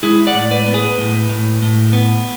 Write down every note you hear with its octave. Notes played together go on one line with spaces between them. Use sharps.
G#3 E4 G#4
D5 F#5
A2
B4 D5
B3
G#4 B4
A2
A2
A2
B3